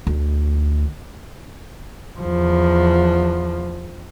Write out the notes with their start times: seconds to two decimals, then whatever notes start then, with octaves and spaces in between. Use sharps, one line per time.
0.07 D2
2.19 E2 F3